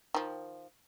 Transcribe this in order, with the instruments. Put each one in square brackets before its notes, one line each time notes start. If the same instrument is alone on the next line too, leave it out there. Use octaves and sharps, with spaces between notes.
[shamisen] D#3 F3